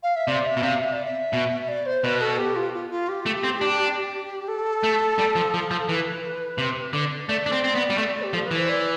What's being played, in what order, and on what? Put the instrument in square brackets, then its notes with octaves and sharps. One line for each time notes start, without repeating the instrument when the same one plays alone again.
[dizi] F5
E5
[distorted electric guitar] C3 [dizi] D5
[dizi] E5
[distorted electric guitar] B2
[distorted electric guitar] C3 [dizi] F5
[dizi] E5
D5
E5
[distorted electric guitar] B2
[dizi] D5
C5
[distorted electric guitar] B2 [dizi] B4
[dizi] A4
G4
F4
F4
F4
G4
[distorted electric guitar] A3
C4
D4
[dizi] A4
[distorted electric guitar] A3
G3
F3
F3
F3
[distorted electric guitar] E3 [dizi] B4
[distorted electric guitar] C3
D3
[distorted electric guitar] A3 [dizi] D5
[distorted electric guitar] D4
C4
C4
B3
G3
A3
[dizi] G4
[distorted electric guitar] F3 [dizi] A4
[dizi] B4
[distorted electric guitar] E3
[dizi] C5
D5